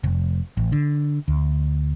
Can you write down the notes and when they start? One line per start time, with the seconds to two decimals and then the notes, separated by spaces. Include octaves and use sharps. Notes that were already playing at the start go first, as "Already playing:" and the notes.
0.04 F1
0.57 A1
0.72 D3
1.28 D2